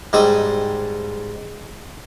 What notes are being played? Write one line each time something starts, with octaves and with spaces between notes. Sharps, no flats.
G#2 G3 C4 D#6